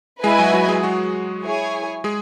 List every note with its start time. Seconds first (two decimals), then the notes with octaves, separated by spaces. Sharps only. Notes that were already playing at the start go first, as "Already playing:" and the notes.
0.23 G#3 E4 G#4 B4 D#5 G#5
0.39 F#3 F#4
0.54 F#3 F#4
0.69 G#3 G#4
0.83 F#3 F#4
1.44 E4 G#4 C#5 G#5
2.04 G#3 G#4